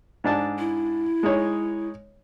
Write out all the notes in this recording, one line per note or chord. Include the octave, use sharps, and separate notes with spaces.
G#2 D4 A5
E4
G#3 D#4 C#5